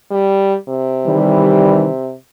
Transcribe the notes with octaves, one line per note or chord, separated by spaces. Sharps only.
G3
C3
D#3 E3 G3